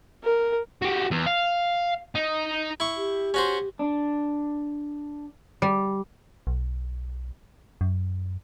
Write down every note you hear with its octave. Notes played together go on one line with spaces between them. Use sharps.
A#4
F#4 G4
E2
F5
D#4
E4 C#6
G4
C#4 F#4 C5
D4
G3
B1
F#2